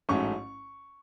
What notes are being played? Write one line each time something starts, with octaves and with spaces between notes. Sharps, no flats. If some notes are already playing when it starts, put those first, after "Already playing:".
A1 G#2 F#3 A3 C#4 C#6